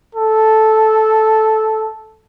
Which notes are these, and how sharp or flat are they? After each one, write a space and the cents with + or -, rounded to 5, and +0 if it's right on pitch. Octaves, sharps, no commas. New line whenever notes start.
A4 -10